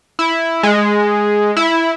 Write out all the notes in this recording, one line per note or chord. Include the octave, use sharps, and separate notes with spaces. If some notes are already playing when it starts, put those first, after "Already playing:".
E4
G#3
E4